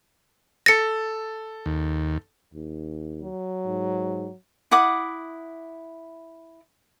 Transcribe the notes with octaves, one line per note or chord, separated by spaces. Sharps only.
A4 A6 A#6 C#7
D#2
D#2
F#3
G#2
E4 F#5 D6 D#6